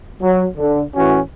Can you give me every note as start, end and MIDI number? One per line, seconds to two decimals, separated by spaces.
0.22 0.44 54
0.57 0.81 50
0.96 1.19 45
0.96 1.19 52
0.96 1.19 61
0.96 1.19 66